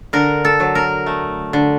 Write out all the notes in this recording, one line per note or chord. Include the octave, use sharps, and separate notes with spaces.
D3 A#4
A4
F#3
A#4
A3
D3